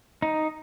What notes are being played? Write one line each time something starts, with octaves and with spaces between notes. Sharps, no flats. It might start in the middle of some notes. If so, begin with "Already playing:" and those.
D#4